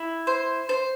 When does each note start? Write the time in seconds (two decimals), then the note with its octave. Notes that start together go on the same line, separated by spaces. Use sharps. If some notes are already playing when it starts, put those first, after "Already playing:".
Already playing: E4
0.27 C5
0.69 C5